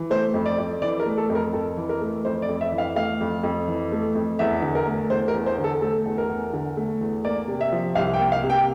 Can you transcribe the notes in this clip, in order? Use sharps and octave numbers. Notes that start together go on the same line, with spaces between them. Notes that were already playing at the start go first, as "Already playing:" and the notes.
Already playing: E3
A3 C5
F2
D5
F2
E3 D5
A#4
A3
A4
F2
A#4
F2 A4
E3
A#4
A3
F2 C5
D5
F2
E5
E3
F5
A3 F5
F2
F2
E3
A3
F2
E2 E5
D3
A#4
A3
E2 C5
A#4
E2
C5
D3
A4
A3 A4
E2
A#4
E2
D3
A3
E2
A#3 D5
C3
E5
F3
C2 F5
G5
A#3
F5
C3
G5